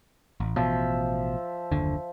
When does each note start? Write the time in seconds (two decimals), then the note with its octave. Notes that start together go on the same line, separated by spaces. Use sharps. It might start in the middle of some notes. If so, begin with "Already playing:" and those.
0.40 A1
0.56 A1 B2 F3 E5
1.72 F#1 D#2 D3